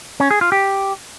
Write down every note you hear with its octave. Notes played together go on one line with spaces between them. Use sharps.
C#4
G#4
F4
G4